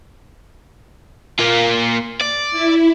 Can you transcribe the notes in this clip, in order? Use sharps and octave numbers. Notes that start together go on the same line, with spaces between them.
A#3 F4
D5
E4